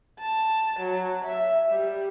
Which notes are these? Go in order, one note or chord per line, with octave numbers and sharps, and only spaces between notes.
A5
F#3
E5
G3